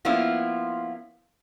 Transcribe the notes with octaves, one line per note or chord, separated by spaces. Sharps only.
F3 A#3 B3 C#4 E4 F4